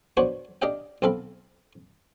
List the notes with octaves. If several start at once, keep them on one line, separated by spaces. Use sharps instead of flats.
B3 D4 F#4 C5 C#5
D4 G4 D5 D#5 F5 G5
B1 C4 A4 F5 B5